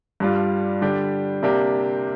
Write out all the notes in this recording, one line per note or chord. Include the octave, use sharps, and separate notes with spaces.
G2 G3 D4 F4
D3 G3 D4 G4
C3 A#3 D4 G4